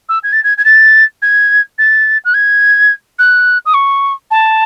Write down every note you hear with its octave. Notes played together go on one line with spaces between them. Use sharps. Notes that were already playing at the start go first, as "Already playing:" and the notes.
E6
G#6
A6
G#6
G#6
A6
G#6
A6
F#6
G#6
F#6
D#6
C#6
A5